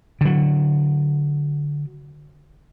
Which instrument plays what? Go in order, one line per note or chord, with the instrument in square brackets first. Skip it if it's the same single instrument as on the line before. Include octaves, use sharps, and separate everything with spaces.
[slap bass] D3 F#3